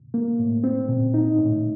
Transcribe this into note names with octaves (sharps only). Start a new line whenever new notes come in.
A#3
A2
C4
A#2
D#4
A2